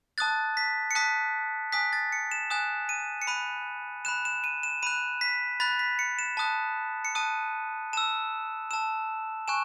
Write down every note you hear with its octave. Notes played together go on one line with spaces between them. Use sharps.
A5 D#6 F#6 A6
B6
C#7
A5 D#6 F#6 B6
G#5 D#6 F#6 B6
A6
C#7
E7
G#5 D#6 F#6 E7
D#7
C#7
B5 F#6 D#7
B5 F#6 E7
E7
D#7
E7
B5 F#6 D#7
B6
B5 F#6 A6
B6
C#7
E7
A5 D#6 F#6
C#7
A5 D#6 F#6 D#7
A5 E6 E7
A5 E6 E7
G#5 C#6 F#6 E7